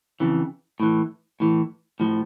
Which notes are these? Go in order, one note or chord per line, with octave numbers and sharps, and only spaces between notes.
F2 C#3 E3
A2 E3
A2 E3
A2 F3